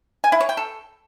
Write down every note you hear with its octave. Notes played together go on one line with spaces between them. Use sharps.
G#5
E4
C#5
G5
A4